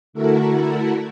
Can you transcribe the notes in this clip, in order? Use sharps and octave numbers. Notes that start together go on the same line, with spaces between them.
D3 A3 E4 F#4 A4 A#4